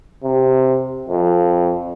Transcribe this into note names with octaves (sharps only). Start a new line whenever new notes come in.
C3
F2